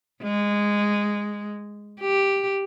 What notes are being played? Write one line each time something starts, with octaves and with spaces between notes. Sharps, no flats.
G#3
G4